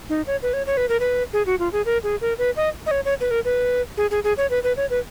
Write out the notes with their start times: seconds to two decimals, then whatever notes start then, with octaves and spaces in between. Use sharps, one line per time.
0.09 D#4
0.27 C#5
0.43 B4
0.53 C#5
0.67 C#5
0.77 B4
0.89 A#4
1.00 B4
1.33 G#4
1.46 F#4
1.59 F4
1.73 G#4
1.85 A#4
2.03 G#4
2.21 A#4
2.38 B4
2.56 D#5
2.86 D#5
2.91 C#5
3.05 C#5
3.21 B4
3.31 A#4
3.45 B4
3.97 G#4
4.11 G#4
4.24 G#4
4.37 C#5
4.50 B4
4.63 B4
4.77 C#5
4.90 B4